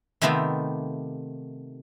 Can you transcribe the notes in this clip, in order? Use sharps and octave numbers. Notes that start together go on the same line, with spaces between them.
C3 D#3 A3 B3 F4 G4